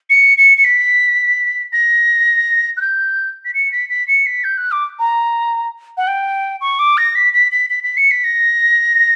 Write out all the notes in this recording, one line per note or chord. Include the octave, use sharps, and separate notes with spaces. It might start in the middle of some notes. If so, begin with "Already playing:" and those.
C#7
C#7
C#7
B6
A#6
F#6
G6
B6
C#7
B6
B6
C#7
B6
G6
F#6
D6
A#5
F#5
G5
C#6
D6
A#6
B6
B6
B6
B6
B6
C#7
B6
A#6